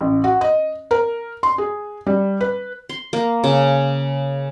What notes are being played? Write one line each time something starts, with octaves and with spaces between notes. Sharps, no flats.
A1
F#4
D#5
A#4
C6
G#4
G3
B4
C6
A#3
C#3